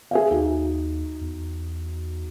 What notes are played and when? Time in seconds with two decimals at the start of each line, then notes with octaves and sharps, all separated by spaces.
0.11 G#4 E5 F5
0.31 D#2 D#4 F#4
1.21 E2